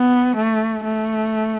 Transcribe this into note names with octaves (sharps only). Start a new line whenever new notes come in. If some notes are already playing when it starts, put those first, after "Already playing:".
Already playing: B3
A3
A3